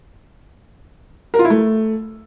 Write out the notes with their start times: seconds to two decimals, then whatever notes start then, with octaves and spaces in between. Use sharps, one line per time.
1.34 A#4
1.39 F4
1.45 E4
1.50 A3